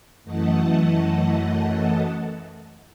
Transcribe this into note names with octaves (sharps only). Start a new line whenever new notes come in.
F#2 E3 A3 D#5 F#5 A5